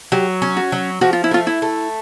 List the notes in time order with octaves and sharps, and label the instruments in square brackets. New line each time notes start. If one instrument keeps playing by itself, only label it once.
[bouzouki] F#3 [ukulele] G4
[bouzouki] C#4
[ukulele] F#4
[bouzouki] F#3
[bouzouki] F3 [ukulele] F#4
[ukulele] F4
E4
[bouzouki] A3 [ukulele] F4
[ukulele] E4
[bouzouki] A3